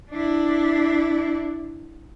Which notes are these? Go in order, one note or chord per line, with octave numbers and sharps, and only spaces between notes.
D4 E4